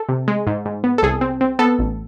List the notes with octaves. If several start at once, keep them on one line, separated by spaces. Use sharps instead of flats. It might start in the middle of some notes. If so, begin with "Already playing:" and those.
Already playing: A4
C3
G#3
G#2
G#2
B3
A4
C2 G#4
C4
C4
B3 A4
A1